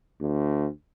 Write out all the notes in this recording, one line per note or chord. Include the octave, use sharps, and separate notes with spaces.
D2